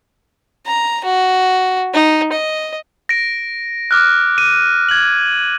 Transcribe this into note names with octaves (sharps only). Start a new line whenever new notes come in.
A#5
F#4
D#4
D#5
A#6 D7
D6 F6 F#6
D#7
G#6 F#7